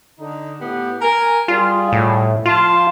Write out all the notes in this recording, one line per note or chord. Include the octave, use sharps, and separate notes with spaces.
D3 D#4
A2 B3 G4
A#4 G#5
G3 F4 G#4
A2
F3 F4 A5 C6